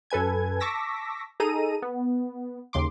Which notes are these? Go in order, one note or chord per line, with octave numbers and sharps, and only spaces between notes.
F#2 A4 B4 G#5 G#6
A5 C#6 D6 E6 A#6 B6
D#4 G#4 A4 A#5 D#7
B3
D#2 C#3 C6 D6